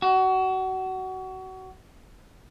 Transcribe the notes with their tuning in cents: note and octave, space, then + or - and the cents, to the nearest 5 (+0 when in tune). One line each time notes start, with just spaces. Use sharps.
F#4 +25